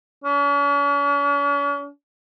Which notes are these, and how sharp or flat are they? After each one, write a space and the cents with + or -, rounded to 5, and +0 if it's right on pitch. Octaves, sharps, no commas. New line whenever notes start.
C#4 +45